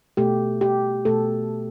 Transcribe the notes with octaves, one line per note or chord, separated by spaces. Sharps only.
B2 A3 G4
G4
B2 A3 A4